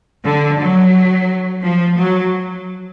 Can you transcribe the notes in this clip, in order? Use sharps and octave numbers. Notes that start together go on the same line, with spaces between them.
D3
F#3
F3
F#3